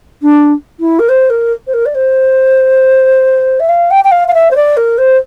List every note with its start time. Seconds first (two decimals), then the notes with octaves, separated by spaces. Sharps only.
0.22 D4
0.80 E4
0.99 A#4
1.09 C5
1.30 A#4
1.67 C5
1.74 A#4
1.86 D5
1.95 C5
3.60 E5
3.69 F5
3.91 G5
4.04 G5
4.11 F5
4.28 F5
4.34 E5
4.51 C5
4.56 D5
4.77 A#4
4.98 C5